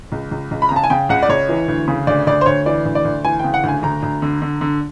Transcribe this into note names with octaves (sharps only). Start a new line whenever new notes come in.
C#2
C#2
C#2
B5
C#3 A#5
A5
G#5
C#3 G5
C#2 F#5
D5
C#2 C#5
E3
D2
C#3
D2 D5
D2 D5
C5
D2 C#5
E3 D5
D2
D5
D2
E3 G#5
C#3 G5
F#5
D2 G#5
D2 A#5
D2
D3
D3
D3